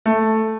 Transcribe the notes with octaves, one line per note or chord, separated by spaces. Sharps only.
A3